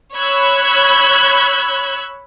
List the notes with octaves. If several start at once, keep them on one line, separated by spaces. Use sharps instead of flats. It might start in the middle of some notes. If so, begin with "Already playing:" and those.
C#5 B5 E6 F#6 G#6